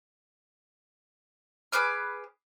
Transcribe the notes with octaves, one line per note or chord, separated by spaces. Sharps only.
G#4 B4 D6 F6